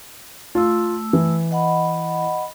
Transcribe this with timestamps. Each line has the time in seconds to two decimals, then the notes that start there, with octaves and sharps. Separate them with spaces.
0.55 A3 F4 E6
1.13 E3
1.51 D#5 F#5 B5